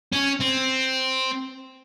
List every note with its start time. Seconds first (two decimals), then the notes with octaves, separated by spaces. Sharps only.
0.13 C#4
0.41 C4